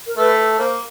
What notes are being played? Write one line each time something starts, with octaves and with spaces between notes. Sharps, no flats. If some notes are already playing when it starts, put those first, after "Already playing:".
A#4
A3 B4
A#3 C5